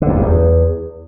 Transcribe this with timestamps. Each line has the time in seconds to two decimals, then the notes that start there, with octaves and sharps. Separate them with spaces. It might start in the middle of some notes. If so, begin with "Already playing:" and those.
0.02 D3
0.08 F2
0.15 G2
0.22 E2